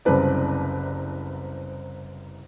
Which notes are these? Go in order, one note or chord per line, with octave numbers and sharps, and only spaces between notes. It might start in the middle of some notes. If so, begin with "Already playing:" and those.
F#1 C2 C4 B4 D5